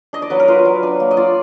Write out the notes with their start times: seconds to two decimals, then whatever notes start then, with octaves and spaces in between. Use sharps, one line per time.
0.13 D4 D#5
0.22 D5
0.30 F#3 B4
0.40 A#4
0.48 F4 B4
0.65 F#3
0.83 D4
1.00 A#3
1.11 D#5
1.17 F4 D5